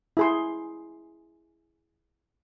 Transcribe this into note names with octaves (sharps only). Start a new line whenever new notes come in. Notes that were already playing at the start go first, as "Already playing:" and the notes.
E4 G#4 C6